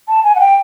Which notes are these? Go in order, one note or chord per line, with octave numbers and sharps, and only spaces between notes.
A5
G#5
F#5
G5